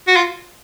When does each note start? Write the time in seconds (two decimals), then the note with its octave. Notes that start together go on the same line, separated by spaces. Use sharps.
0.08 F#4
0.16 F4